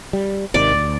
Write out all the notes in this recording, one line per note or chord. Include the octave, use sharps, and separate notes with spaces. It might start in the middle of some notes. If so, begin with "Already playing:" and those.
G3
G#1 C3 D#3 D5
D2